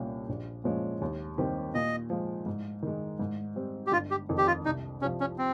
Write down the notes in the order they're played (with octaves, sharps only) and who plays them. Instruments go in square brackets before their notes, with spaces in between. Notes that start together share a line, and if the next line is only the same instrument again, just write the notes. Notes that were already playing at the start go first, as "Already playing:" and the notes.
Already playing: [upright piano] C2 A#2 G3 C#4 G4
A#1
A#2 F3 G#3 C#4
D#2
D#3 G3 C4 G4
[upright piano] A#2 [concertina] D#5
[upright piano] F3 G#3
G#2
D#3 G#3
G#2
G3 C4
[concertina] G4
[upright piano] G1 [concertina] F4
[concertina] G4
[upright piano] F2 D#3
[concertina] G4
F4
[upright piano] C2 [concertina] D#4
[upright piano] C3 F3 [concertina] C#4
[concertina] C#4
C4